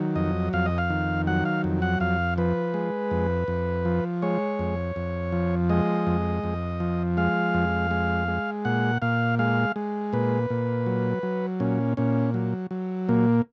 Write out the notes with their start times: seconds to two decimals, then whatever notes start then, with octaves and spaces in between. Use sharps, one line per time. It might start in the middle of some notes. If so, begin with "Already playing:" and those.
Already playing: D#3 F#3
0.16 F2 D#5
0.53 F2 F5
0.66 D#5
0.78 F5
0.90 D#3
1.27 F#3 F#5
1.45 F5
1.64 F2
1.82 F#5
2.00 F2 F5
2.38 F3 B4
2.74 G#3
3.11 F2
3.48 F2
3.85 F3
4.22 G#3 C#5
4.59 F2
4.96 F2
5.32 F3
5.70 G#3 D#5
6.07 F2
6.44 F2
6.80 F3
7.17 G#3 F5
7.54 F2
7.91 G#3
8.28 G#3
8.65 A#2 F#5
9.02 A#2 F5
9.39 G#3 F5
9.76 G#3
10.13 A#2 B4
10.50 A#2
10.86 F#3
11.23 F#3
11.60 A#2 C#4
11.97 A#2 C#4
12.34 F#3
12.71 F#3
13.09 A#2 A#3